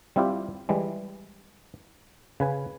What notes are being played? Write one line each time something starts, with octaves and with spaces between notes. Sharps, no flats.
G3 C4 E4 F4 G4
E3 G3 G#3
C#3 B4 G#5